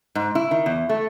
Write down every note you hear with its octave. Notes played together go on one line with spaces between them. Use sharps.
G#2
E4
D#3
E2
A3